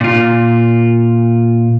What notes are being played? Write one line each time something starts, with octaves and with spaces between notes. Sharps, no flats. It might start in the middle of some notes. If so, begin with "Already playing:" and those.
A#2 F4